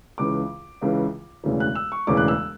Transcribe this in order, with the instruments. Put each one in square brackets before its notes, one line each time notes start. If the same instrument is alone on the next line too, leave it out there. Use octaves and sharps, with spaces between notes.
[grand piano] C#2 C#3 E3 D6
C#2 C#3 E3
E1 D2 C#3 E3
F#6
E6
C#6
E1 D2 C#3 E3 D6
F#6
E6